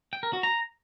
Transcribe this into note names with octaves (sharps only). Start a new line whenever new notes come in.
G5
A#4
F#4
A#5